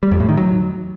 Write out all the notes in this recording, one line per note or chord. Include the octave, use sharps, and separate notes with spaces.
G3
F2
A2
D#3
F#3